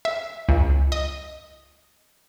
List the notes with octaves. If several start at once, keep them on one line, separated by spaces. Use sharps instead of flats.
E5
C#2
D#5